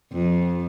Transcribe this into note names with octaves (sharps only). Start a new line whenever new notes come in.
F2